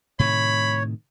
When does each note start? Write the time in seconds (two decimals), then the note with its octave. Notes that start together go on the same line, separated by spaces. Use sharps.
0.19 A2 C3 D#3 C#5 B5